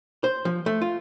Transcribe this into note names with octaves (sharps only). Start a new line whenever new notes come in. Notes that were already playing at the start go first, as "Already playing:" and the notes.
C5
F3
A3
F4